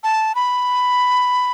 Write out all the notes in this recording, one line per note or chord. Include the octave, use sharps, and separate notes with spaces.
A5
B5